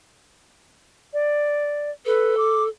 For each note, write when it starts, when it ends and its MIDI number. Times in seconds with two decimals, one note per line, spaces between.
1.14 1.91 74
2.06 2.68 69
2.06 2.35 71
2.37 2.63 86